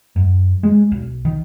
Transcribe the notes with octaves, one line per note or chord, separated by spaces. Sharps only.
F#2
G#3
B1
D#3